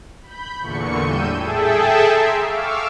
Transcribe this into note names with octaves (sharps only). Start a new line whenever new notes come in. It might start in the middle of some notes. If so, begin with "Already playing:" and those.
B5 G6
E2 A#2 D3 C#6 C#7
A2 G3 E6 G6 D#7
G#4 A4 E5 G5 A5
E5 A#5 C6 C7 D7
F5 C#6 D6 E6 F6